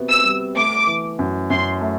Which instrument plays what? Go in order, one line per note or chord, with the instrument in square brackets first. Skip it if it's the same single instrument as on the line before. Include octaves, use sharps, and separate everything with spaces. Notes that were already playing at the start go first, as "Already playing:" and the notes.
Already playing: [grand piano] C3 B3 F#4
[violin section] E6
[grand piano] G3
[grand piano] A3 [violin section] D6
[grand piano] E3
F#2
[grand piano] F#2 [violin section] C6
[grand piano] A3